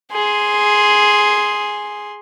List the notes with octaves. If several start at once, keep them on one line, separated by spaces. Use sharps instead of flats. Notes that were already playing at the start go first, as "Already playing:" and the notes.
G#4 C6